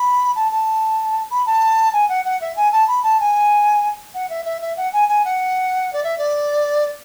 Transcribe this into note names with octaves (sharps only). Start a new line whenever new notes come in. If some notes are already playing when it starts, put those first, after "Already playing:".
Already playing: B5
A5
A5
B5
A5
G#5
F#5
F#5
E5
G#5
A5
B5
A5
G#5
F#5
E5
E5
E5
F#5
G#5
G#5
F#5
D5
E5
D5